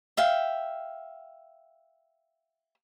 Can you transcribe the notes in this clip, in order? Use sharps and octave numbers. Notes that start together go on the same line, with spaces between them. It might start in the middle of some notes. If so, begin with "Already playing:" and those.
E5 F5 G5